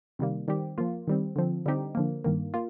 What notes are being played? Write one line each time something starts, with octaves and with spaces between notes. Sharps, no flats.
C3 D#3 G3 A#3
D#3 G3 C4 G4
F3 A#3 F4
D#3 G3 C4
D3 F3 C4
D3 G3 C4 D#4 G4
D3 F3 A#3
G2 D#3 A#3
A#3 F4